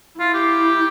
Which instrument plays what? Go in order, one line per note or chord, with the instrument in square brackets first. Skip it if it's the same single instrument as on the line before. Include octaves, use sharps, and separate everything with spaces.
[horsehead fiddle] E4 [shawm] F4
[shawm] G4